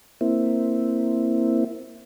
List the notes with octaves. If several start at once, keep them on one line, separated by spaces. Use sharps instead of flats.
A#3 C4 E4